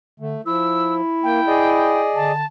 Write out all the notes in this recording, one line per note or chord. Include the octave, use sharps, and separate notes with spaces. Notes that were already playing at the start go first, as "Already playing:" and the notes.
D3 A3
F3 E4 E6
A#3 G5
G#4 D5 D#5
D3 A5